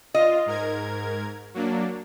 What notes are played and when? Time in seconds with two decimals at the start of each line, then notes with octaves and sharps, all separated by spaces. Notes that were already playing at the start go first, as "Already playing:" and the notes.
0.14 F4 D#5
0.46 G#2 A#4 G#6
1.54 F#3 A#3 D4